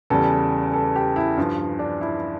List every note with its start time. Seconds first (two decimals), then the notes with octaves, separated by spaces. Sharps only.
0.10 E2 C#3 G3 A4
0.73 A4
0.96 G4
1.16 E4
1.37 G2 F3
1.79 D4
2.01 E4